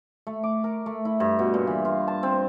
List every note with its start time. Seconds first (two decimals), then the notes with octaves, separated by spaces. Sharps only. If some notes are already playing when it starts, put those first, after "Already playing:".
0.27 A3
0.43 D6
0.64 A#4
0.86 A3
1.05 E4
1.20 G2
1.39 B2
1.54 A#2
1.67 E3
1.85 F4
2.08 A5
2.23 C4